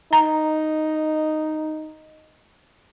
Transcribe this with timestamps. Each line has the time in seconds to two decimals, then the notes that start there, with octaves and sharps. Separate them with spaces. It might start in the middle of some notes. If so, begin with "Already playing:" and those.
0.13 D#4 A#5